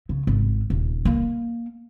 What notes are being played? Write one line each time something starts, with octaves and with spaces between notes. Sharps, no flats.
C#3
G#1
D#1
A#3